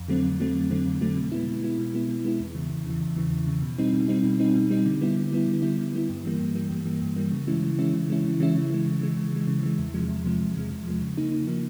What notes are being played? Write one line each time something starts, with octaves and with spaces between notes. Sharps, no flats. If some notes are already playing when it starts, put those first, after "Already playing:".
Already playing: F2
D3 F#3 A3 C4
F2
D3 F#3 A3 C4
F2
D3 F#3 A3 C4
F2
D3 F#3 A3 C4
B2
G#3 B3 E4
B2
G#3 B3 E4
B2
G#3 B3 E4
B2
G#3 B3 E4
E2
C#3 E3
E2
C#3 E3
E2
C#3 E3
E2
C#3 E3
B2
G3 C4 D#4
B2
G3 C4 D#4
B2
G3 C4 D#4
B2
G3 C4 D#4
D3
G3 B3 E4
D3
G3 B3 E4
D3
G3 B3 E4
D3
G3 B3 E4
G2
E3 G3 A#3
G2
E3 G3 A#3
G2
E3 G3 A#3
G2
E3 G3 A#3
C#3
E3 G#3 C#4 E4
C#3
E3 G#3 C#4 E4
C#3
E3 G#3 C#4 E4
C#3
E3 G#3 C#4 E4
C#3
E3 G#3
C#3
E3 G#3
C#3
E3 G#3
C#3
E3 G#3
E2
C3 F3 G#3
E2
C3 F3 G#3
E2
C3 F3 G#3
E2
C3 F3 G#3
C#3
F3 A#3 D#4
C#3
F3 A#3 D#4